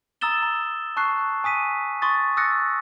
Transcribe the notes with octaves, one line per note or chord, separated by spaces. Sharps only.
A#5 D#6 E6 A6 E7 G7
A#5
A5 C#6 F#6 C7
G#5 D#6 B6 D#7
C6 C#6 D#6 A6
D#6 E6 F#6 A6 A#6 C#7